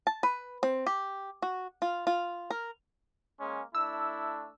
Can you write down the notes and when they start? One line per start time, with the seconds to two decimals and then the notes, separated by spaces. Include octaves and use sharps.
0.07 A5
0.23 B4
0.63 C4
0.86 G4
1.42 F#4
1.82 F4
2.07 F4
2.50 A#4
3.40 G#3 A#3 C#4
3.75 A3 D4 E4 E6